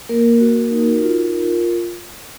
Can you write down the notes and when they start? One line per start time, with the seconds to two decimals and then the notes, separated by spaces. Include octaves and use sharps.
0.09 A#3 A#4
0.40 F#4
0.71 D#4
1.02 F4